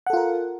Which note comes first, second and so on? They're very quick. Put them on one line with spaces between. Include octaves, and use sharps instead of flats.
F#5 A4 F4 A#4